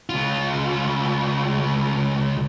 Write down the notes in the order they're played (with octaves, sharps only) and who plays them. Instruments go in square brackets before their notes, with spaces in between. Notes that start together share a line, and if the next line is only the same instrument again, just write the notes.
[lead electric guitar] C#2 F4